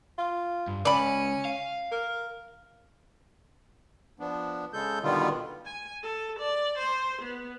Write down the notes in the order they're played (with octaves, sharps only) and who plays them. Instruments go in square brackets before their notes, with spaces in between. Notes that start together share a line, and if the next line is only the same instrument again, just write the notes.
[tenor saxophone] F4
[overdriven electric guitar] G2
[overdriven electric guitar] C#2 [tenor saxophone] C#4 [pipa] D5 B5
[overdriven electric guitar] F5
[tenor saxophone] A#4
[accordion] F3 B3 D4
C#3 G#3 A4 G6
B2 D3 D#3 G3 B3 F4
[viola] G#5
A4
D5
C5
B3